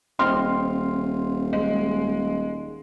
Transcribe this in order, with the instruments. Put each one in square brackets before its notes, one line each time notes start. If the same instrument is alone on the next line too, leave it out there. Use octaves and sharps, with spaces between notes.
[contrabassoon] D#1 [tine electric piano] C4 D#5 F6 [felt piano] C6
[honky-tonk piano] G#3